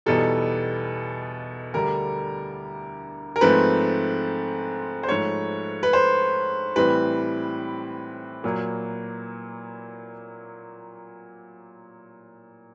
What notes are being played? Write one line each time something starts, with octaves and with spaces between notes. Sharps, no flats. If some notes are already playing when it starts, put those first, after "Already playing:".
E2 B2 G3 B3 D#4 A4
D2 D3 G3 A#4
A#4
G#2 F3 A3 C4 B4
C5
G#2 F3 A3 C#5
B4
C5
A2 E3 G3 C4 B4
A#2 F#3 A#3